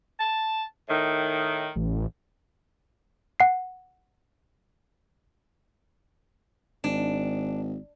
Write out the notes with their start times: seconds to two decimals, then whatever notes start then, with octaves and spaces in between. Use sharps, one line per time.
0.20 A5
0.89 A2 D#3
1.76 A1
3.40 F#5 C7
6.84 G#1 D4